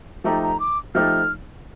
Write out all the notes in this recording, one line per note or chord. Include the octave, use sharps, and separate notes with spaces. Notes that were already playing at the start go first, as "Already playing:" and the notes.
F3 A3 D#4 G4 A#5
A#5
D6
F3 A3 D#4 G4 F6